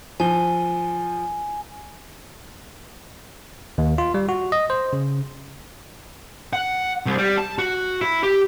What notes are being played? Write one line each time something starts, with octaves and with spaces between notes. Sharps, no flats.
F3 G#5 G7
D#2
F4
G3
F#4
D#5
C5
C#3
F#5
C2
G3
A5
F#4
E4
G4